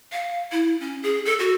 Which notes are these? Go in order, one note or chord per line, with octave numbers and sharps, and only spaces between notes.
F5
E4
C#4
G#4
A4
F#4